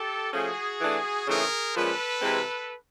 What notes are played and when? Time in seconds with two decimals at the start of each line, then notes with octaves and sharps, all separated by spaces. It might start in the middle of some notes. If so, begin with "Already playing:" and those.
Already playing: G4 A4
0.32 F3 A3 C#4 F#4 G#4
0.80 E3 A3 D4
1.27 C#3 E3 A3 C4 D#4 G#4 A#4
1.75 A#2 F3 G#3 C#4 A4 B4
2.21 C3 E3 G#3 C4